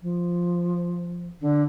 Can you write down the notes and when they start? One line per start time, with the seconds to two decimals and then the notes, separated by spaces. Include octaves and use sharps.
0.02 F3
1.41 D3